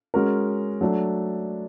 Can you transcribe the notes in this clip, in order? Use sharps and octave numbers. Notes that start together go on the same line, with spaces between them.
G#3 C#4 F#4 A#4
F#3 A3 D4